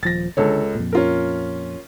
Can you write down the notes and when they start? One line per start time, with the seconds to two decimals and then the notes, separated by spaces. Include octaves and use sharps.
0.03 D#1 F3 A6 A#6
0.37 C#2 D3 A4 C#5
0.75 F2 A#2
0.93 C#4 F4 A#4